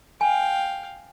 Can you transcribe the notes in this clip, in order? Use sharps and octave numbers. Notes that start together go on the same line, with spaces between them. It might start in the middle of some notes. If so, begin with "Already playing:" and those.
F5 G5 G#5